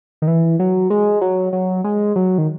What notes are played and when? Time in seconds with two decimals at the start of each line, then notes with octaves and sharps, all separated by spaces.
0.22 D#3
0.27 E3
0.59 F#3
0.90 G#3
1.21 F#3
1.53 F#3
1.84 G#3
2.16 F#3
2.38 D#3